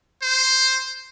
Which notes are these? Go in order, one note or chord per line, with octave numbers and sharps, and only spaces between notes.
C5